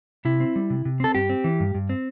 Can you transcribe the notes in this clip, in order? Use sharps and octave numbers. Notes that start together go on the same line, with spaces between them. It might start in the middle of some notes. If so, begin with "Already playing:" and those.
C3 E4
C4
G3
C3
C3
C4 A4
G2 G4
C4
E3
G2
G2
C4